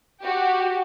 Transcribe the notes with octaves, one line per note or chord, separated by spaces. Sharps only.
F#4 G4